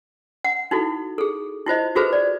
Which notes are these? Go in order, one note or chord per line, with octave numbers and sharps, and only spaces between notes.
F#5
D#4 E4 F#4 A4
G#4 A4
E4 F4 C5 D#5
F4 F#4 G#4 A4 B4 C5
D5